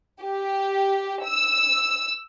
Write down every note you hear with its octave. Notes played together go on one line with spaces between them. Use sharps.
G4
E6